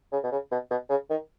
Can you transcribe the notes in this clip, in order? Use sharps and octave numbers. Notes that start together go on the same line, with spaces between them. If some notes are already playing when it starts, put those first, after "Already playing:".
C#3
B2
C#3
B2
B2
C#3
D#3